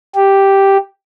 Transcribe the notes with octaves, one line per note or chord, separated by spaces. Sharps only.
G4